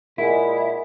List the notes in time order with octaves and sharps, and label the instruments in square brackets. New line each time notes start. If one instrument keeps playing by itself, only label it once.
[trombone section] A#2 G#3 [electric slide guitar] E4 [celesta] A#4 F#5 G#5